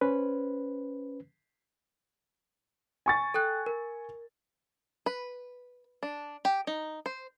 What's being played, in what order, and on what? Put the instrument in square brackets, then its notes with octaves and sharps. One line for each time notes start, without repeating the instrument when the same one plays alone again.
[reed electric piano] C#4 B4 C5
[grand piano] G#5 C#6 A6
[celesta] A4 G5 F#6
A#4
[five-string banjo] B4
D4
G4
D#4
C5